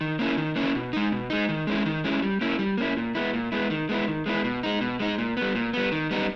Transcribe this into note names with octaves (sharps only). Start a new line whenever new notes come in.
D#3
A#3 C#4 E4
D#3
A#3 C#4 E4
B2
G#3 D#4
B2
G#3 D#4
D#3
G#3 C#4 E4
D#3
G#3 C#4 E4
G3
A#3 C#4 E4
G3
A#3 C#4 E4
A#2
G#3 B3 E4
A#2
G#3 B3 E4
D#3
G#3 B3 E4
D#3
G#3 B3 E4
B2
G#3 D#4
B2
G#3 D#4
A#2
G3 B3
A#2
G3 B3
D#3
G3 B3 D#4